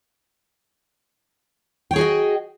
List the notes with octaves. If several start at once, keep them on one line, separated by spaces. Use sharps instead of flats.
F#4 G#4 C#5 D#5 G5